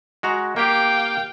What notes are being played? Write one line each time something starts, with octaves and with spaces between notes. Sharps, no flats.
G#3 F#4 A#5
A#3 G4 F5 G5